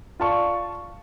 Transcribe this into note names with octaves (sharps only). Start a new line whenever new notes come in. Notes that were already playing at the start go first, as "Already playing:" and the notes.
F4 D5 A5 C#6